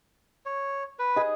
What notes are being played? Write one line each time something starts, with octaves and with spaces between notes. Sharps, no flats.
C#5
B4
G#4 D#5